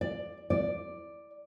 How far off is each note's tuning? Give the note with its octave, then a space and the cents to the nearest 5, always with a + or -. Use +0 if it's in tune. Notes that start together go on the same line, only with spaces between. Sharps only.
D5 +10
D5 +5